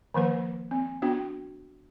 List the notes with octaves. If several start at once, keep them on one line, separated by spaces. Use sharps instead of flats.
D#3 F3 A#3 B4
C4
B3 D4 F#4 G5